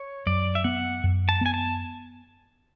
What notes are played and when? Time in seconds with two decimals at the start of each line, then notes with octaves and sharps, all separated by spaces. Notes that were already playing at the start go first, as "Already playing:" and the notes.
Already playing: C#5
0.26 F#2 D5
0.55 E5
0.64 B3 F#5
1.04 F#2
1.29 A5
1.41 B3 G#5
1.54 A5